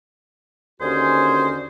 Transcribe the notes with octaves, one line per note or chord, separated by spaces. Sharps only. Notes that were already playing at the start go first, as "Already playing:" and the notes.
D#2 D3 C#4 F#4 G#4 C5